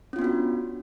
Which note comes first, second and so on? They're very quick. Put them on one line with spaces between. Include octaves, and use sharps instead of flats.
C#4 F4 B3 D4 F#4